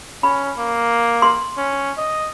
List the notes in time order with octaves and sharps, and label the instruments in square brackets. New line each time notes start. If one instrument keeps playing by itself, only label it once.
[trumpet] C#4 [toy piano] B5
[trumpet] A#3
[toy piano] C6
[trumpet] C#4
D#5